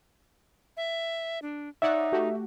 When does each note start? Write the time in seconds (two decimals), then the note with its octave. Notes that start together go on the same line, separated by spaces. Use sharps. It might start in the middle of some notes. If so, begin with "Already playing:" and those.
0.77 E5
1.42 D4
1.82 D#4 C#5 D5 E5 F#5
2.12 A3 F#4 G4